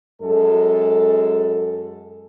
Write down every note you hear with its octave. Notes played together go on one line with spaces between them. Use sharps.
F#2 G#3 A4